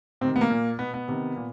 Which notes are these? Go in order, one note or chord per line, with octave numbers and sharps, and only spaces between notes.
C3 D#3 C4
B3
A#3
A#2
B2 B3
B3
C3 D#3
A#2